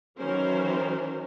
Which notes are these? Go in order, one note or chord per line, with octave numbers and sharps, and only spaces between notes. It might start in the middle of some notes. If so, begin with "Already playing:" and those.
D#3 E3 F#3 C#4 A#4 C5